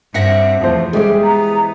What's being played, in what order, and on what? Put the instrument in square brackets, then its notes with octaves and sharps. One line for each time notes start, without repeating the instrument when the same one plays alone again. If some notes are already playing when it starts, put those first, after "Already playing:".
[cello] G2 C4 [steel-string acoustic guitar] G4 E5 F#5 [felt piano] A#6 C#7
[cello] E2 A3 [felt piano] F3 C5
[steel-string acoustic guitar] E3 C5 [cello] G3 [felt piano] G#3 G4 G#4
[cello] B3 [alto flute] A#5